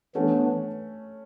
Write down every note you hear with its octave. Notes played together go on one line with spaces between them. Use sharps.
E3 A3 B3 C#4 D4